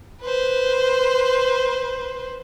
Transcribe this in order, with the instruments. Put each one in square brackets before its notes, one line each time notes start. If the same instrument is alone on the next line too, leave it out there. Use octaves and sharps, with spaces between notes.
[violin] B4 C5